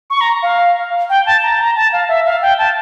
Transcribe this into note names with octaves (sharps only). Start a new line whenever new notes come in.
C#6
A#5
F5
G5
A5
A#5
A#5
A5
F5
E5
F5
G5
A5